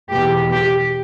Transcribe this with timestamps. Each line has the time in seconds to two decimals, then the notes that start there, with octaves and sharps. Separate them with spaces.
0.11 E2 B2 G4
0.52 G4